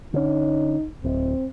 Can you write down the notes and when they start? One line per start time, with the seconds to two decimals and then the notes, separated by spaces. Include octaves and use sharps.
0.13 D3 C#4 D#4
1.04 D1 C4